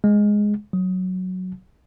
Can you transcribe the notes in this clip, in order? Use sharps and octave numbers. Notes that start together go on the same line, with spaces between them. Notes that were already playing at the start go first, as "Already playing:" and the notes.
G#3
F#3